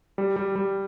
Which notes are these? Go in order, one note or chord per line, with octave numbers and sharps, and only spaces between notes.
G3
G3
G3